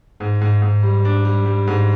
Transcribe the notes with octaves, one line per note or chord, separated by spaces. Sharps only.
G#2
G#2
G#2
G3
D4
G3
G3
G#2